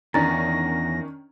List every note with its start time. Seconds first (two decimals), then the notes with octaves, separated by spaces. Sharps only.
0.14 E2 D#3 C#4 D4 A#5 A6 A#6